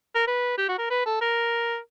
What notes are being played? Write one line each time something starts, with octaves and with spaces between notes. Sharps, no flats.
A#4
B4
G4
F#4
A#4
B4
A4
A#4